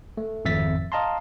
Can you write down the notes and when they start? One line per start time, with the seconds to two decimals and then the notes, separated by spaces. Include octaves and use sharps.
0.17 A3
0.45 G#1 F2 E5 A6 B6
0.92 D#5 F5 A5 A#5 C6